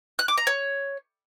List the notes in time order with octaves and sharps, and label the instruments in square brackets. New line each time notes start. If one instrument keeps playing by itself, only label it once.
[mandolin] F#6
D6
A#5
C#5